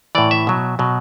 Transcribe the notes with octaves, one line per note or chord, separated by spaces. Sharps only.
A2 E3 D5
E5
B2 F#3
B2 F#3